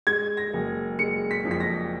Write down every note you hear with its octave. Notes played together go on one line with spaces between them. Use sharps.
G#3 G#6
A#6
F#1
G#3 C#7
B6
F2
B6
A#6